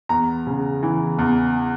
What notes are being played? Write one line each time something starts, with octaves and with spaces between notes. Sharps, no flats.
E2 A#5
C#3
E3
E2